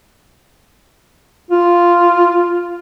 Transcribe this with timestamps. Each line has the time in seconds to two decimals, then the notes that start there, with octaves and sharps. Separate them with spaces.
1.51 F4